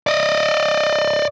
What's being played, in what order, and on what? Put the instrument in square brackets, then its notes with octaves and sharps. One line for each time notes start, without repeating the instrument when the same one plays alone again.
[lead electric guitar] D5 D#5